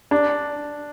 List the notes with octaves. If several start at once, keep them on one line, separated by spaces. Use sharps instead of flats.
D4